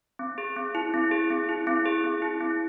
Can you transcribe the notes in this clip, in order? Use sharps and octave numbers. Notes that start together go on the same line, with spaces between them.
C4
G#4
C4
E4
C4
G#4
C4
E4
C4
G#4
C4
E4
C4